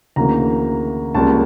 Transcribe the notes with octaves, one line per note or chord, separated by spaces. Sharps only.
D2 C#3 E3 A#3 A#5
C#2 C#3 G3 A#3 A5